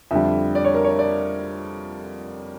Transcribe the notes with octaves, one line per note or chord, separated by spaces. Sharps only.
F2 D3 G3 E5
D5
C#5
A#4
C#5
D5